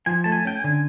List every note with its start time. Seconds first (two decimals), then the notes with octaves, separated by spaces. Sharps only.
0.06 F3 G#5
0.24 A3 A5
0.32 G#5
0.45 C#4 G5
0.57 G#5
0.64 D3